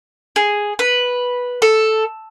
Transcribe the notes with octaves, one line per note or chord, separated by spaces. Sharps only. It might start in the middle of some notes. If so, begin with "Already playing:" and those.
G#4
B4
A4